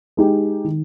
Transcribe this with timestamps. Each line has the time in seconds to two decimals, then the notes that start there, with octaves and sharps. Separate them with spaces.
0.17 G#3 D#4 G4
0.64 D#3